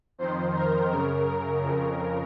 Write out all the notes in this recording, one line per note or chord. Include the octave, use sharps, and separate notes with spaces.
F2 D#3 C5
A#4
F#2 C#3 A#4
A#4
F2 C#3